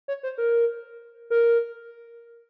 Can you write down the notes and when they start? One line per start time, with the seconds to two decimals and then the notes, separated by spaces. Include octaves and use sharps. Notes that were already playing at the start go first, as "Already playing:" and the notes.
0.08 C#5
0.23 C5
0.38 A#4
1.30 A#4